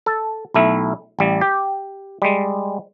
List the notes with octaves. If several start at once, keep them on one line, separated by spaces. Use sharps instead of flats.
A4
B1 A3 E4
A1 G3
G4
G3 G#3